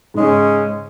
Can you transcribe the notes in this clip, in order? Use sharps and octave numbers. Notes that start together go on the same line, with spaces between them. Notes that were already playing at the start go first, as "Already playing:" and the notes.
G#2 C#3 G#3 C#4